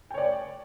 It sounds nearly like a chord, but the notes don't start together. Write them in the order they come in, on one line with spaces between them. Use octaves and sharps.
G5 C#5 D5